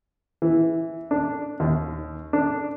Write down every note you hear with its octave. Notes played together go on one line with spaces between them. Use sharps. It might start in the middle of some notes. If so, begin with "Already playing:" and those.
E3
D4
D#2
D4